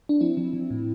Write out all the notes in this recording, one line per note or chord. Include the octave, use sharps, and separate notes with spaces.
D4
F3 C4 E4
F3
F3
A2